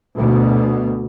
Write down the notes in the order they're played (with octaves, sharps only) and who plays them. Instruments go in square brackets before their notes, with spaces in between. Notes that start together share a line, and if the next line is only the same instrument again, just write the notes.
[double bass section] D2 B2